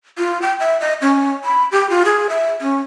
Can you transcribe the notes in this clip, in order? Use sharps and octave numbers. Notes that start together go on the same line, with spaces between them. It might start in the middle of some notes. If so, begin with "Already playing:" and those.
F4
G5
E5
D#5
C#4
B5
G4
F4
G#4
E5
C#4